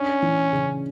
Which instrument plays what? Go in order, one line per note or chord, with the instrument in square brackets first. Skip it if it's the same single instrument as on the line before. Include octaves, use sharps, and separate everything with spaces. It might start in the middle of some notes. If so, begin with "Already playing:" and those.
Already playing: [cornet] C#4 [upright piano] D4
[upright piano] E3
C#3